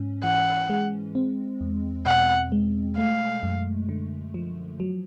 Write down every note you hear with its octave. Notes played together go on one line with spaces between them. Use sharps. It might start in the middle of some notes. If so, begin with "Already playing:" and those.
Already playing: G#2 C#4
E3 F#5
G#3
C4
E2
B2 F#5
G#3
A3 F5
F#2
D3
F3
F#3